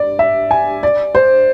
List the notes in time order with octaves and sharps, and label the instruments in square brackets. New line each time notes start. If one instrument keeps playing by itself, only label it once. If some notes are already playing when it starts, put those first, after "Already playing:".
Already playing: [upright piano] D5
E5
G#5
D5
C5